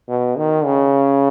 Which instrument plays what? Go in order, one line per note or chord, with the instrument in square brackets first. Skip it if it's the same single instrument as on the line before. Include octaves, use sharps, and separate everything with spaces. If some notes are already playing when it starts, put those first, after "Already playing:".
[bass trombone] B2
D#3
C#3